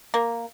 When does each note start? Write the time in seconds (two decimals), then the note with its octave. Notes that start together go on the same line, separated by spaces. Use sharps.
0.14 A#3